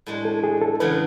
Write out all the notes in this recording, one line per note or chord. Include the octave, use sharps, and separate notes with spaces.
A2 G#3 D4
A4
G#4
A4
E2 C#3 E3 A3 D4 B4